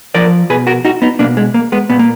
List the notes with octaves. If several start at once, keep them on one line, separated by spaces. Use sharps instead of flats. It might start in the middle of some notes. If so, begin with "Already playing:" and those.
F3 A#4 D5
B2 G#4 B4
F#4 A#4
D#4 F#4
B3 D#4
B2 A#3 D4
G#3
A#3
G#3 B3
A#2 B3
A#3